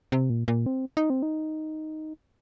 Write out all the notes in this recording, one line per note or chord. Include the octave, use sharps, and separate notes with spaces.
C3
A#2
A#2
C4
D#4
C4
D#4